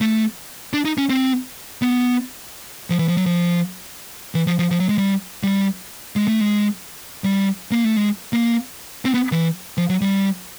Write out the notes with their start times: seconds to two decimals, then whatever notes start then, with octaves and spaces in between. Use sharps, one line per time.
0.01 A3
0.73 D4
0.85 D#4
0.98 C#4
1.09 C4
1.82 B3
2.90 F3
2.99 E3
3.08 F3
3.17 F#3
3.26 F3
4.35 E3
4.47 F3
4.59 F3
4.71 F3
4.80 F#3
4.89 G#3
4.98 G3
5.43 G3
6.16 G#3
6.28 A3
6.41 G#3
7.24 G3
7.71 A#3
7.84 A3
7.97 G#3
8.33 A#3
9.05 C4
9.14 B3
9.32 E3
9.78 F3
9.89 F#3
10.01 G3